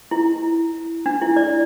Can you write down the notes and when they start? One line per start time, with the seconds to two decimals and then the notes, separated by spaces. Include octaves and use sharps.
0.11 E4
1.06 D4
1.22 E4
1.36 D5